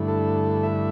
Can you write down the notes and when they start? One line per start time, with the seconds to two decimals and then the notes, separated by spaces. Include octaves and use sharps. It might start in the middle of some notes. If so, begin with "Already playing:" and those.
Already playing: G2 D3 A3 E4
0.08 A4
0.63 E5